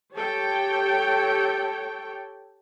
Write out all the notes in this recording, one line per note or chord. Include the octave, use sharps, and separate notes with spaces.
G4 A4 C#5 G5